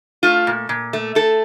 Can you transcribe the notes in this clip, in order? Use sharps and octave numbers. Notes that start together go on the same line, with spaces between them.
A3 F4
A#2
A#2
A3
A3 A4